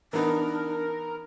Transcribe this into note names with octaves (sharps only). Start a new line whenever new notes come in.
E3 B3 D4 D#4 A#4